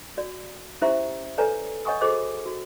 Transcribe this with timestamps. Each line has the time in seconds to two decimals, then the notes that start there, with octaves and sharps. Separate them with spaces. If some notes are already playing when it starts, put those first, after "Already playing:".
0.17 F#4 D5
0.81 C#4 E4 G4 C5 E5 A#5
1.38 A4 B4 C#5 D5 G#5 A#5
1.85 C#5 D#5 F#5 G#5 C#6 D#6
2.01 F#4 G#4 A4 C5 D#5 D6
2.46 F#4